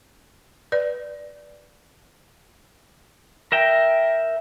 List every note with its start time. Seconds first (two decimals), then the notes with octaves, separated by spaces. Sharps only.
0.72 B4 D5
3.52 A#4 E5 G5